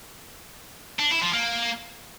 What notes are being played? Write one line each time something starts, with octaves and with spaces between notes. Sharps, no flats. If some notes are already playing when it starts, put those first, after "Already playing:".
D4
E4
F3
A#3